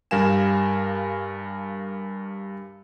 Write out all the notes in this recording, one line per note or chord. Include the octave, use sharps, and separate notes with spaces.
G2 G3 A#4 F5 G#5 E7